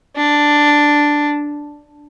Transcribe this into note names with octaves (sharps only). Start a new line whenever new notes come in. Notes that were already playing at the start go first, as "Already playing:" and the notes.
D4